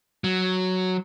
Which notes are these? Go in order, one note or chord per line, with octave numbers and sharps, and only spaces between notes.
F#3